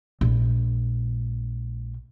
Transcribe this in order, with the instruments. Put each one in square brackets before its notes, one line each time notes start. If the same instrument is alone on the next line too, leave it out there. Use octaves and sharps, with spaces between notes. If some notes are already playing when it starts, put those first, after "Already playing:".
[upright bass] A#1 G#3